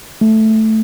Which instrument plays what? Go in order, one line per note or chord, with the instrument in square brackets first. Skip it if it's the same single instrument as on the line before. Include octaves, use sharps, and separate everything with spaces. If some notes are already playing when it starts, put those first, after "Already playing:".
[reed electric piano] A3